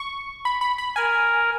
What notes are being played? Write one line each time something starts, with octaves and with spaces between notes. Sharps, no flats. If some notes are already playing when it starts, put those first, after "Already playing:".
Already playing: C#6
B5
B5
B5
A#4 G#5